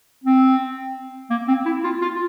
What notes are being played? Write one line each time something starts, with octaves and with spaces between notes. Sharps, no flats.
C4
A#3
C4
E4
F4
F4